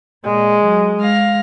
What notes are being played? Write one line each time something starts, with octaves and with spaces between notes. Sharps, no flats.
A#2 G#3
F#3
G#3 F5 A#6